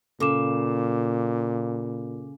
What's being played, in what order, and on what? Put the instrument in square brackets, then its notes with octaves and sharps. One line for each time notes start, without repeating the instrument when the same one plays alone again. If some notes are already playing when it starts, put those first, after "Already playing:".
[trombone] A#2 [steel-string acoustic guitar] C#3 [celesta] A4 D6 E7